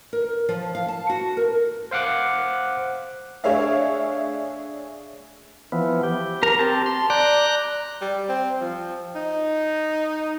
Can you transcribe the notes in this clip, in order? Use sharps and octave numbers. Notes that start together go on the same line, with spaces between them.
A#4
F3
F5
A5
F#4
A#4
C5 F5 F#5 D6 F#6
A3 D4 G#4 C#5 E5 F5
E3 F3 B3
G4
A#4 A#5
C4 G4 A5
C6
D5 A#5 F#6 G6
G3
C4
F3
D#4